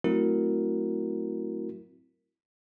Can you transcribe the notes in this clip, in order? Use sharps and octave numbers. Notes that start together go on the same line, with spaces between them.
F#3 A3 C4 E4 F#4 A#4